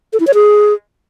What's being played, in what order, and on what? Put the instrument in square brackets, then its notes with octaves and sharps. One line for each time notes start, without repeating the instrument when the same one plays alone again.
[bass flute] A4
E4
C#5
G#4